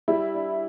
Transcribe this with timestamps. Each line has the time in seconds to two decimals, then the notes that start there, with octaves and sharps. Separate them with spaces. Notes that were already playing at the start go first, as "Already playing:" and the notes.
0.08 G3 E4
0.34 D4